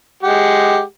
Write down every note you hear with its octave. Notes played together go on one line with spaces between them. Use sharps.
G#3 G4 F#5